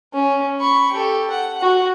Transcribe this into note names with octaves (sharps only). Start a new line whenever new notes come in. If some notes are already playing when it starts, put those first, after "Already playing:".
C#4
B5 C#6
G4 A4
F#5
F#4